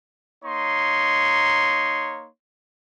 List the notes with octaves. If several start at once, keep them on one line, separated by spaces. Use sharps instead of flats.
A#3 D#4 C#5 C6